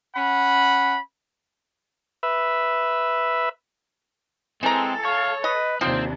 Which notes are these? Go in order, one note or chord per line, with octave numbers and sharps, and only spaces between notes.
C#4 F#5 B5
B4 E5
E3 G#3 C4 A4 A#5
C#5 F5
B4 D#5
D#2 C3 F3 C4 D4 C5